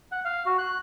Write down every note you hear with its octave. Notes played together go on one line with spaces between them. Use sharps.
F#5
F5
F#4
F#6